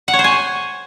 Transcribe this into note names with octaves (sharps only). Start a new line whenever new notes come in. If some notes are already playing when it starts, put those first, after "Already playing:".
F#5
C#5
C5
G#5